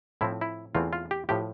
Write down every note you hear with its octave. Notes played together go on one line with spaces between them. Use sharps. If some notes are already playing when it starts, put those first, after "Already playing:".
A2 F3 C4 E4
E4
E2 E3 A3 C4 F4
F4
G4
A2 F3 G4